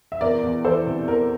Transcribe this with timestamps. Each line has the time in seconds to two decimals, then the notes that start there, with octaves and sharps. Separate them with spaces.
0.12 E5
0.21 E2 A#4 D5
0.43 E2
0.64 E3 A4 C5
0.86 C3
1.07 E2 A#4